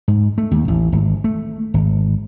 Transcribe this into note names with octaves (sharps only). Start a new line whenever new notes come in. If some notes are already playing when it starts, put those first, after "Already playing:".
G#2
A3
D#2
A1
G#1
A3
G#1